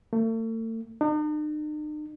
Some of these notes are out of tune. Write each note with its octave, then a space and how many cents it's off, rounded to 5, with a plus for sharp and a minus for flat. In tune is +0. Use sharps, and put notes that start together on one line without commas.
A3 +40
D#4 -45